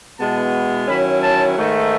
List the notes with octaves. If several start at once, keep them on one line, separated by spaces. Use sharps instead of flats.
B2 G#3 B3 E4 A5
D#3 F#3 C#4 E4 B5
A5
G#2 D#3 A3